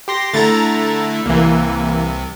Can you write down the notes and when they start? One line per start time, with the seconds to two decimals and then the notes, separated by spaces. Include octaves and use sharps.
0.08 G4 C6 A#6
0.34 D3 A3 E4 A#5 A6
1.26 C2 C3 E3 A#3